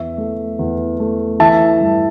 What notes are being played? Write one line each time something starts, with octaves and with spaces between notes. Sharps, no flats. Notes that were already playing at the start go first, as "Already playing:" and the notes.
Already playing: E2 E5
A3
E2
A3
E3 E5 A5
G2